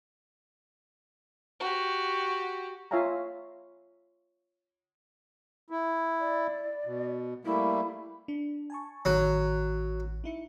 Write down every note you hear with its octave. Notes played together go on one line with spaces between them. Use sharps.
F#4 G4
F4 C#5 E5 F5 G#5 A#5
E4
D5
B2
G3 A3 A#3 E4
D4
G#5 A5 C#6
A1 D#3 F#3
D#4 E4 C#7